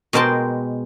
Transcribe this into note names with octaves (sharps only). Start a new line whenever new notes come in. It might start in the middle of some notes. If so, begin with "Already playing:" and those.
B2 G#3 A#4 C5 G5 A5